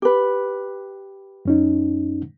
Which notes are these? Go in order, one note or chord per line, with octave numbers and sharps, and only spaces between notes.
G4 B4
F#2 C#4 D#4